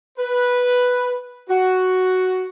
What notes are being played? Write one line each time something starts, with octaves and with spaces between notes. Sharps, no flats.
B4
F#4